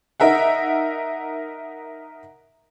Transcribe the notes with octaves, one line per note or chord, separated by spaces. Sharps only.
D#4 A#4 E5 F#5